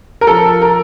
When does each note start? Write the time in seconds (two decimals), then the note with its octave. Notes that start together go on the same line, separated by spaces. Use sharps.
0.21 A#4
0.27 F3 A4
0.61 A#4